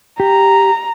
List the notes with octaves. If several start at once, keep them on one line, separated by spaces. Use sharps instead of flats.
G4 A#5